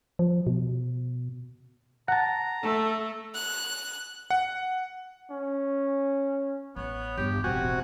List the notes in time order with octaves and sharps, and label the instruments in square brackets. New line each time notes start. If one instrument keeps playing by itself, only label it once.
[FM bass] F3
B2
[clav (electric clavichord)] F#5 A5 [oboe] A#5
[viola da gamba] A3 [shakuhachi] A4
[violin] F#6
[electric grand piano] F#5
[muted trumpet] C#4
[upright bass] A1 [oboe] B3 [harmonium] C#5
[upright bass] G1 E2 [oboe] G4
[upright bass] E1 A1 [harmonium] C3 C4 [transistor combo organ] F#4 [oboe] G#5